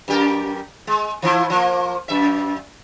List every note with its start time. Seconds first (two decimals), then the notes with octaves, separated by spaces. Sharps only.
0.08 F#2 G4 A#4
0.87 G#3
1.22 E3 F3 E4
1.50 F3 A#3
2.08 F#2 E5